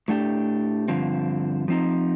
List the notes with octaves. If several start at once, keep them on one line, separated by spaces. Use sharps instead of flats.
A2 A3 D4 G4
G2 D3 F3 C4
F3 C4 D#4